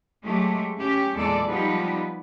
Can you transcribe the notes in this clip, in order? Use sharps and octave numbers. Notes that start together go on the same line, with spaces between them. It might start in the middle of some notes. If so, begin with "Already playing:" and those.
F#3 G#3 A3 G4
C#4 G4
E2 A#2 G#3 A4 D5
F3 G3 B3 D#4 G4 B4